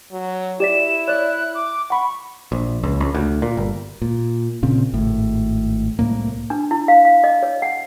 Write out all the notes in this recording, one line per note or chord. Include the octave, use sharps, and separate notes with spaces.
F#3
E4 G4 D5 B6 E7
C#5 D5 F#6
D6
F#5 B5 C#6
A#1
C#2
C#2
D2
A#2
G1
A#2
A#2 C#3 C4
G#1 A2
C2 A2 A#3
D4
E4
F5
F5
D#5
C#5
F#5